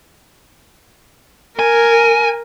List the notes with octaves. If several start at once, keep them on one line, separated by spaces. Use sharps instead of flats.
A#4 G#5